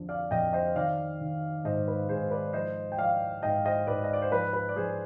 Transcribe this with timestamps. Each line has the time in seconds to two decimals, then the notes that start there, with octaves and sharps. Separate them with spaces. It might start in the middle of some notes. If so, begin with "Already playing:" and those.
Already playing: F2 D3 F3
0.09 D5 F5
0.31 F2 D#5 G5
0.53 C5 D#5
0.75 D#3 D5 F5
1.21 D#3
1.64 G#2 C5 D#5
1.88 B4
2.09 G#2 G#4 C5
2.31 B4 D5
2.53 F3 C5 D#5
2.92 G5
2.98 F3 D5 F5
3.42 G#2 D#5 G5
3.65 C5 D#5
3.87 G#2 B4 D5
4.04 D#5
4.13 D5
4.22 C5
4.32 F3 B4
4.53 B4
4.69 D5
4.76 F3 G#4 C5